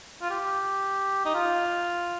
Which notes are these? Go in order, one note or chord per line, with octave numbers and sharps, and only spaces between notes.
F4
G4
D#4
F4